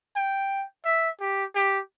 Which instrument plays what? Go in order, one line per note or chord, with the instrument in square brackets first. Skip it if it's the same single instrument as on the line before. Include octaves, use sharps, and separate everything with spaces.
[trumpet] G5
E5
G4
G4